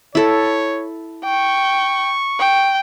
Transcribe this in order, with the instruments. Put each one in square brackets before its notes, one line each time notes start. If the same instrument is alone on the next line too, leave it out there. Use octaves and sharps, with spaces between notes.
[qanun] E4 A4 [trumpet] C#5
[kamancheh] G5 [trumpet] C#6
[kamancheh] G5